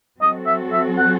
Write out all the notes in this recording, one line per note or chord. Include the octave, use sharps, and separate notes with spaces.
F#3 C4 F#4 A4 D#5
E5
E5
F#5